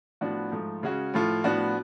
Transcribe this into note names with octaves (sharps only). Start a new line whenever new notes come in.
A2 F3 B3 D4 F#4
G#2 F3 A3
C#3 G#3 C#4 F#4
A2 F3 A3 F4
A2 F3 B3 D4 F#4